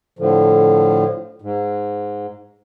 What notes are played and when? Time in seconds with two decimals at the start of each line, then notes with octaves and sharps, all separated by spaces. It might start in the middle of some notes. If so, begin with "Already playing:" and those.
0.19 A2 D3 F3
1.42 G#2